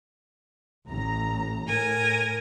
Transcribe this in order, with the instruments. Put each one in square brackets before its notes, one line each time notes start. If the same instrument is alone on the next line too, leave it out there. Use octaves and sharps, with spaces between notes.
[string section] A1 A#5
[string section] A2 [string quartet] A#4 G#5